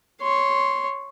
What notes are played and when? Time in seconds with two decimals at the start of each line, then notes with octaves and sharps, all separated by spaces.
0.22 C#5 C6